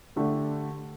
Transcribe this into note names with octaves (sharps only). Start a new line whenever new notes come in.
D3 A3 D4 G4